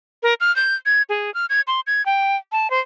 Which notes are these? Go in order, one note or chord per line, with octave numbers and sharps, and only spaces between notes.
A#4
F6
G6
G#6
G#4
F6
G#6
C6
G#6
G5
A5
C5